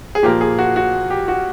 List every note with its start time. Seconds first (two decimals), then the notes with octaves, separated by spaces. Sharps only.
0.15 G#4
0.23 A#2 F3 A#3 G4
0.41 G#4
0.59 F#4
0.76 F#4
1.10 G4
1.28 F#4